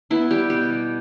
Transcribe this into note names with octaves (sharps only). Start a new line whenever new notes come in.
B3 E4
G3 G4
B2 G4
G3